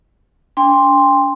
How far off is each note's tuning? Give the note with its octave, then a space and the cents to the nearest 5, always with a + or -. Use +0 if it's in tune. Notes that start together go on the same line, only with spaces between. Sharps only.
D4 -40 G5 +35 C6 +0